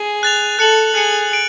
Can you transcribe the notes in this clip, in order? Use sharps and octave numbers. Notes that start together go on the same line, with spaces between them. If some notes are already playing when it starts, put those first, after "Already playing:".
Already playing: G#4
F#6 A6 F7
A4 F#6 C#7 F#7
G#4 F#6 C#7 F#7
D7 F#7